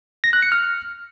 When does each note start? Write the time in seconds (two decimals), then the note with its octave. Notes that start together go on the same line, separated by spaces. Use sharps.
0.24 A#6
0.33 F#6
0.42 C#7
0.52 F6